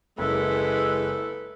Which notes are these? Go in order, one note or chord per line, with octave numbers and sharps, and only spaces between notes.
F#1 G#3 E4 A4 B4